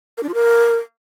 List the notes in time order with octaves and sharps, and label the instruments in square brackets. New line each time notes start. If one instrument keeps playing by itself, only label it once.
[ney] A#4
D4
F4
A#4